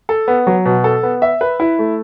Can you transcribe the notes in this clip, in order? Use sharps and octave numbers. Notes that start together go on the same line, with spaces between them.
A4
B3
F#3
B2
A4
B3
E5
B4
E4
A3